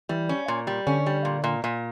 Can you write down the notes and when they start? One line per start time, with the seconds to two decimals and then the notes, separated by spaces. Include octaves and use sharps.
0.09 E3 G3
0.29 C#4
0.48 A#2
0.67 G3
0.87 D3 C#4
1.06 G3
1.25 A#2
1.44 A#2
1.64 A#2